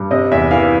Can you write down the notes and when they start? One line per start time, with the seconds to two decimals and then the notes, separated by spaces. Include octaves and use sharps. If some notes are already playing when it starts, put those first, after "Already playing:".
Already playing: G2
0.11 C3 D#5
0.31 E2 E5
0.51 E3 F5